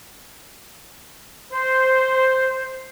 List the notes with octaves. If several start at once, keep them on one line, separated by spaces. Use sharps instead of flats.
C5